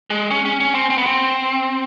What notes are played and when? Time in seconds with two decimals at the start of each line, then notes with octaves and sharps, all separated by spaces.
0.10 G#3
0.31 C#4
0.45 C#4
0.60 C#4
0.75 C4
0.90 C4
0.98 B3
1.06 C4